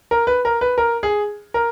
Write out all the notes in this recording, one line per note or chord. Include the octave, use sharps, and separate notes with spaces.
A#4
B4
A#4
B4
A#4
G#4
A#4